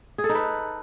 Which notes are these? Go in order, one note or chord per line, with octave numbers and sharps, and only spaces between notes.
G#4
A4
D#4
B4